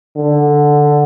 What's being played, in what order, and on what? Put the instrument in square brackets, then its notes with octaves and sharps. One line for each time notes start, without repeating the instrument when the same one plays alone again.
[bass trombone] D3